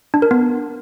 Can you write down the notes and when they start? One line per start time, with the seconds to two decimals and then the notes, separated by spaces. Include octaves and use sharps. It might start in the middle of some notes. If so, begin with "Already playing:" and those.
0.14 D4
0.22 A#4
0.31 B3